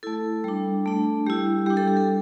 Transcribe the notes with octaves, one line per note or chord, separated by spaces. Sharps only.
A3 E4 A4
G3 D4
A3 D4
G3 E4 G4
G3 D4 G4
A4
G4
A4